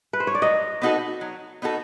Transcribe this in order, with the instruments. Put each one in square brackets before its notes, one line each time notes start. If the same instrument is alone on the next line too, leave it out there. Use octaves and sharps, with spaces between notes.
[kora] B4
C5
C#5
D5
[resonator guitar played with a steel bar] F#3 [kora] D#5
[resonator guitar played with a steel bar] B3 D#4 F#4 A4
F#3
B3 D#4 F#4 A4